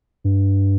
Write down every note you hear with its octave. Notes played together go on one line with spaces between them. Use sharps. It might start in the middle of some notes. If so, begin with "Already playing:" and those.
G2